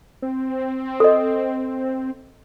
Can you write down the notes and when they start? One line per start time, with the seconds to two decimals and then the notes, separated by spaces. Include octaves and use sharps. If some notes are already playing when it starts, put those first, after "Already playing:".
0.22 C4
1.00 A4 D#5